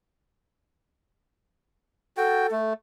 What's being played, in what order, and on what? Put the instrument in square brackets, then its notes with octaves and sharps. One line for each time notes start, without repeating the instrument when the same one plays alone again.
[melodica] F#4 G5 [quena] A4
[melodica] A3